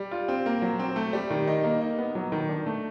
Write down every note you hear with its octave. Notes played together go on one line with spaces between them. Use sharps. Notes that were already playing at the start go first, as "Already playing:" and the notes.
Already playing: G3
F4
C4
A#3
F#3
C4
A3
G3
D#3
D#4
A#3
D#4
B3
F#3
D#3
D4
A3